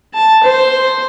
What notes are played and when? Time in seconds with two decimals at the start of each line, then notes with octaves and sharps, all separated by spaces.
0.14 A5
0.43 C5